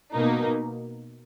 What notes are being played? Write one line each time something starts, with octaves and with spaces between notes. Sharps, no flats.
B2 A#3 D#4